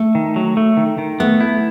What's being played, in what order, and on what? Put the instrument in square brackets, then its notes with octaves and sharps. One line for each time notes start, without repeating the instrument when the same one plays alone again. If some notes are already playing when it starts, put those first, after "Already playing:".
Already playing: [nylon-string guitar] A3
[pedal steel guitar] D#3
F#3
A3
D#3
D#3
[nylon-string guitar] A3 [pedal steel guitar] B3
[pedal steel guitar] E4